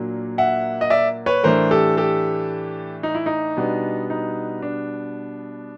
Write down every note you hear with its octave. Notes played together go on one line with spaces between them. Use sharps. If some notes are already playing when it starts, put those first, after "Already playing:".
Already playing: A#2 F#3 A#3 D4
E5 F#5
D#5
D5 E5
B4 C#5
A2 E3 A3 D4 A#4 C5
G4 A4
G4 A4
D#4
E4
D#4
B2 G3 B3 D4
D#4
D4